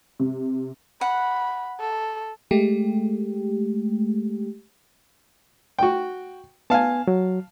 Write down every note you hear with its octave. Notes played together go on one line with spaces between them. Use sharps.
C3
F#5 B5
A4
G#3 A3 G4
F#4 G5
B3 F5 G#5 A5
F#3